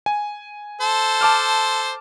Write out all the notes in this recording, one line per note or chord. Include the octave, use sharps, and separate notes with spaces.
G#5
A4 C5
A5 D6 F6